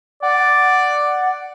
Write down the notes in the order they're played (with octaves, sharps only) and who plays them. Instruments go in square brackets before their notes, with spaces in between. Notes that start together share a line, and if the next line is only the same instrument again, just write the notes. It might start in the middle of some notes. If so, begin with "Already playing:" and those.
[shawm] D5 [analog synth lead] F#5